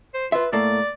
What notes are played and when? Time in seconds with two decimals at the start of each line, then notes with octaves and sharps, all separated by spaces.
0.14 C5
0.32 F4 B4 E5
0.52 A2 A3 A#3 D5